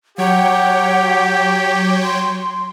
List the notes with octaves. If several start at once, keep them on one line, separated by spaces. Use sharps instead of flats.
F#3 G4 C#5 F#5 G5
C6